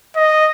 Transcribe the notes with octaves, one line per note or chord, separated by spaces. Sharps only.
D#5